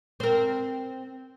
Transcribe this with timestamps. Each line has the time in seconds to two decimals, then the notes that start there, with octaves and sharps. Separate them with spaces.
0.20 C4 A#4